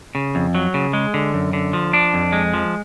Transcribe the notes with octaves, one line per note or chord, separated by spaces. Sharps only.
C#3
F2
F#3
C#3
G#3
D3
F#2
D3
F3
D4
F2
G#3
F3